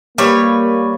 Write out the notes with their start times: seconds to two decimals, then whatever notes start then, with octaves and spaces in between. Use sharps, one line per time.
0.18 G3 A#3 B4 C#5